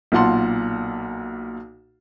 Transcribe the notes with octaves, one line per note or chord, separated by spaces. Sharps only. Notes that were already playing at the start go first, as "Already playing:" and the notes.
B1 A#2 F4 F#5 A5 C6